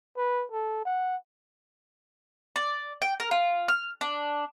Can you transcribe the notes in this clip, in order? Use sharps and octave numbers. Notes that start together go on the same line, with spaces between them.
B4
A4
F#5
D5
G5
A#4
F4
F6
D4